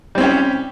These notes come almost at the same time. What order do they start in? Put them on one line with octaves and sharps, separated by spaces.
G3 C4 C#4 G4